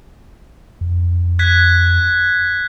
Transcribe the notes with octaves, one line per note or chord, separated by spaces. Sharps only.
F2
F#6 G#6 B6